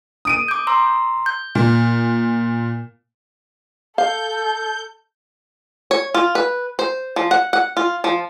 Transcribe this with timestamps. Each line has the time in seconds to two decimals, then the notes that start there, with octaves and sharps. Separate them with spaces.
0.25 D#6 D7 D#7
0.48 D6 G6
0.67 A#5 C6 E6
1.26 G6
1.55 A#2
3.98 A4 F5 G6
5.91 C#5
6.14 F4
6.35 B4
6.79 C5
7.16 F3
7.31 F#5
7.53 F#5
7.77 F4
8.04 F3